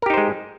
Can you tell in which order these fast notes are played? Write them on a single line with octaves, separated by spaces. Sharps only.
A#4 G4 D#4 C5 G#3